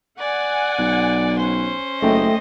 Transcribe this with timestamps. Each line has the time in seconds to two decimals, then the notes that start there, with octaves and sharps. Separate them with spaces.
0.19 D5 F#5 G#5
0.79 B1
1.38 C#4 C5
2.02 F#1 A3 D#5 G5